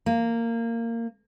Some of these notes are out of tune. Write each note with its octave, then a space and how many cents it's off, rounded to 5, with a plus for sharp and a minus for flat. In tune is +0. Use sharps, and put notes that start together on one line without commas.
A#3 -15